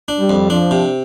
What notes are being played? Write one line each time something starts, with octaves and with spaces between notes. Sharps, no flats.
D4
G3
F2
F3 D4
C3